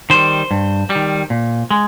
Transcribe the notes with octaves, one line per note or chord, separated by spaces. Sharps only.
D#3 G3 C5
G2
G3
D#3
A#2
G#3